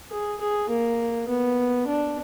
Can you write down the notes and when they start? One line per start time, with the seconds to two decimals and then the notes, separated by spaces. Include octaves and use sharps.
0.11 G#4
0.41 G#4
0.70 A#3
1.28 B3
1.87 D4